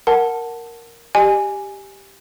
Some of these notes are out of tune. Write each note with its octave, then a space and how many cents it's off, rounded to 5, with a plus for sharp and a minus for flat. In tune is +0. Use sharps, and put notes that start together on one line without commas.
A#4 +0 F#5 +0 A5 +0
G4 +0 D#5 -35 G#5 +0